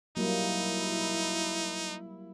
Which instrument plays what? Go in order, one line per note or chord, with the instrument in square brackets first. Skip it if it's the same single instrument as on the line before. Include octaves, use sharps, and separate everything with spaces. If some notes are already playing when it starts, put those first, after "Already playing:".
[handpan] F#3 G3 A#3 [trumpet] D#4 [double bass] E4